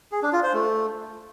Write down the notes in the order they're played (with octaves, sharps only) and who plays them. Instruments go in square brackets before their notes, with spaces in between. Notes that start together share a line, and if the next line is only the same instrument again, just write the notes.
[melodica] G#4
D4
F4
C5
A3